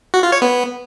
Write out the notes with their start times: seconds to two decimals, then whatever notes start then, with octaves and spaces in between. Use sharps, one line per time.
0.14 F#4
0.23 F4
0.32 C#5
0.42 B3